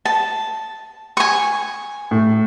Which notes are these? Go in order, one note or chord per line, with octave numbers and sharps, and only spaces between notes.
A5
G#5 C#6
A2